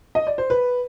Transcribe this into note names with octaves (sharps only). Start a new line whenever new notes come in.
D#5
D5
C5
B4